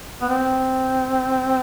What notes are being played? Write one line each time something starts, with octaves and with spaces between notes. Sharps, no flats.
B3
C4